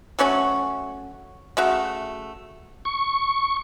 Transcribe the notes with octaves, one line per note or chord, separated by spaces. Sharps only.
F#3 A3 C#4 F#4
C#3 A3 F#4 E5
C#6